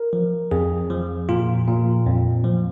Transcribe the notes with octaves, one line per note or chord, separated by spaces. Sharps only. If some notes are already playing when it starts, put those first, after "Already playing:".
Already playing: A#4
F3
F2 G#4
F3
A#2 F4
A#2
F2
F3